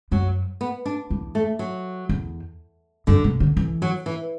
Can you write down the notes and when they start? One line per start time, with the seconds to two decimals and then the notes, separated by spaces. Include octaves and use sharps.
0.12 F#2 F#3
0.61 B3
0.85 D4
1.10 E2
1.35 A3
1.59 F#3
2.09 E2
3.07 F#2 D3
3.24 B2
3.40 D3
3.57 E3
3.82 F#3
4.06 E3